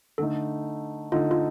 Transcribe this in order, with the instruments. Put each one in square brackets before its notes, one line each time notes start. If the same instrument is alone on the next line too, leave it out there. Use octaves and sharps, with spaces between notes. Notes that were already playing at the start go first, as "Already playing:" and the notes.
[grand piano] D3 A3 D#4 [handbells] A4
[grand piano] D3 A3 D#4 [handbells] F4
[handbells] F4